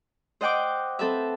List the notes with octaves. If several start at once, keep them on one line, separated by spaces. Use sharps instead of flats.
C5 D#5 F#5 G5 D6
C4 A4 B4 E5